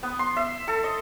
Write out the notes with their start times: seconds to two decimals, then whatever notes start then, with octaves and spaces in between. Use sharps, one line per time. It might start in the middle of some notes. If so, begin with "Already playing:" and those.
0.03 B3
0.19 C6
0.37 E5
0.68 A4
0.84 D#5